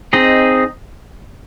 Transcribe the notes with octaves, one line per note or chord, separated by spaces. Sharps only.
C4 D#4 G#4 D#5